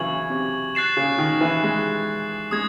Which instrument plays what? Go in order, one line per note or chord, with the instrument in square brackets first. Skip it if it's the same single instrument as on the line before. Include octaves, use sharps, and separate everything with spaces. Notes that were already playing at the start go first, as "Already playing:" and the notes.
Already playing: [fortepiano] C#3 E3 F#3 [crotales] C#6 G#6 F#7
[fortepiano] C3
[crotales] F#6 A6 C7 E7
[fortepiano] C#3
D#3
E3
G#3
[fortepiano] G#3 [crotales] D#6 G#6